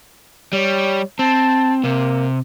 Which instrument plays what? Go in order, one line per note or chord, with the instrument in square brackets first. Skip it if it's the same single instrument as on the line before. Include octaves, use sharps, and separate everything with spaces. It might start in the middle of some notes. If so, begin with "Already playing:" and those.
[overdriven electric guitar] G3 [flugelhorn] C#5
[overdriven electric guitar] C4 [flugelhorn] A5
[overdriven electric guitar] C3 [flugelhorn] A#3